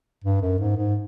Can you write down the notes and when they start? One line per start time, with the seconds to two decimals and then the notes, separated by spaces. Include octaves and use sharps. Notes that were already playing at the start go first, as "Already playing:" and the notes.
0.24 G2
0.42 F#2
0.60 G#2
0.77 G#2